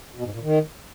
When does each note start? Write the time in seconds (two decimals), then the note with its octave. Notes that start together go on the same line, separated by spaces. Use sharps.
0.15 B2
0.24 G#2
0.33 A#2
0.42 D#3